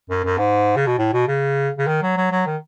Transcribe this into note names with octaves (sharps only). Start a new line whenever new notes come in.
F#2
F#2
G#2
C#3
B2
A2
B2
C#3
C#3
D#3
F#3
F#3
F#3
D#3